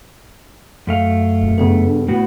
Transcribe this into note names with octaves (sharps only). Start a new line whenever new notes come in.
F#2 A3 F5
D#1
G2 C#3 B3 A4
A2 B3 F#4